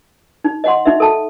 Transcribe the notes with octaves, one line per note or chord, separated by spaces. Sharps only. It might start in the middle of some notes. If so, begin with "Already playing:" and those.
D#4
D#5 F#5 C6
D#4 E5
A4 A5